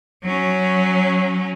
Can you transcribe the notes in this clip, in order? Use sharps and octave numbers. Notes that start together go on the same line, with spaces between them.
F#3 C#4